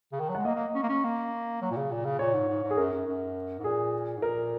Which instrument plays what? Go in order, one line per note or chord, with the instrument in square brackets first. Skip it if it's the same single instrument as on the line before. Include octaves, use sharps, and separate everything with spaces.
[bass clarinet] C#3
D#3
F#3
[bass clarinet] G#3 [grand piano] F#5
[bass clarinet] A#3 [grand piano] D#5
[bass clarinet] A#3
C#4
A#3
C#4
A#3
F#3
A#2
C#3
A#2
C#3
[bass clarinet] A#2 [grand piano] C#5
[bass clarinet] G#2
G#2
G#2
[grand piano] G#4
[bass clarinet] F#2 [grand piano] A#4
[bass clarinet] F#2
F#2
G#2
[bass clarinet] A#2 [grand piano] G#4
[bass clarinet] G#2
[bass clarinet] A#2 [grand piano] A#4